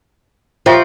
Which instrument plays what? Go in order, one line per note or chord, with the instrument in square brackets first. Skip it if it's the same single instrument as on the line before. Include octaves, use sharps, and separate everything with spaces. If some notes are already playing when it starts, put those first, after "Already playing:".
[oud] F3 [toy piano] F4 C5 E5 G5 C#6